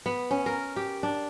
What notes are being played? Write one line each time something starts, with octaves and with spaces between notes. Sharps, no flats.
B3
C#4
A#4
G4
D4